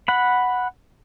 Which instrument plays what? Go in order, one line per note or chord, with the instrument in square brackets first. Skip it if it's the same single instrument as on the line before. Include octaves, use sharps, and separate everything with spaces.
[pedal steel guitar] F#5 B5